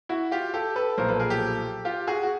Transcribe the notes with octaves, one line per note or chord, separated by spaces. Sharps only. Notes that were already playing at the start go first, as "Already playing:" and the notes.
E4 F#4
F4 G4
G4 A4
A4 B4
B1 A#2 F3 A#4 C5
A4 B4
G#4 A#4
G4 A4
F4 G4
F#4 G#4
F#4